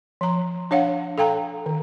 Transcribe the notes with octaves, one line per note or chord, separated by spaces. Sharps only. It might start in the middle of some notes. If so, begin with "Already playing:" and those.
F3 A#5
D4 C#5 F5 F#5
A4 F5 G5 A#5
D#3